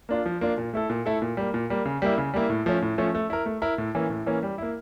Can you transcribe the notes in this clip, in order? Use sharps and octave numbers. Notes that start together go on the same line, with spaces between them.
A#3 D4 F4
F3
A#3 D4 F4
A#2
A3 E4 A4
A#2
A3 E4 A4
A#2
G3 A#3
A#2
G3 A#3
C#3
G3 A#3 E4
C#3
G3 A#3 E4
A2
F3 A3 C#4
A2
F3 A3 C#4
A3
E4 A#4
A3
E4 A#4
A2
E3 A#3 C#4
A2
E3 A#3 C#4
G3
A#3 E4